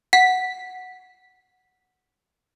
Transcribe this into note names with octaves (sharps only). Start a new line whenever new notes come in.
F#5 B6